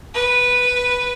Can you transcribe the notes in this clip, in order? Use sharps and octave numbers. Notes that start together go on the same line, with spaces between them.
B4